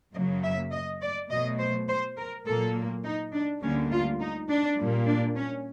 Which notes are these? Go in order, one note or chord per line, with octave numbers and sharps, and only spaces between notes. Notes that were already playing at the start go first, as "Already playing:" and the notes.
F#2 C#3 F#3 A#3 D#5
E5
D#5
D5
B2 F#3 A3 D#5
C5
C5
A#4
A#2 F#3 A#3 A4
D#4
D4
D2 D3 G3 A#3 C#4
F4
D#4
D4
A#2 G3 A#3
D4
C#4